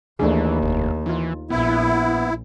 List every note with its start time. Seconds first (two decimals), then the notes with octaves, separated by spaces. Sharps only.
0.19 D#2 E3 A3 D4 G#4
0.63 F1
1.06 E3 D#4 F4
1.50 A#1 B3 E4